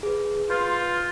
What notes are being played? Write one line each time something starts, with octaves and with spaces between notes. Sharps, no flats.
G#4 B4
F4 B4 C6 G6